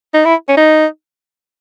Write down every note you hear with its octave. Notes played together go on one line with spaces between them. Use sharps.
D#4
E4
C#4
D#4